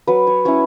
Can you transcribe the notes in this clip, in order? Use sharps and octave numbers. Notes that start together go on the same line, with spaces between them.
F#3 B4
C#5
C#4 E4 C#5